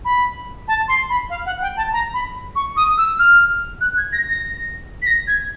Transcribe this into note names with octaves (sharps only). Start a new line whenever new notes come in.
B5
A5
C6
B5
F5
F#5
G5
A5
A#5
B5
C#6
D#6
E6
F6
F#6
G#6
A#6
A#6
B6
A#6
G#6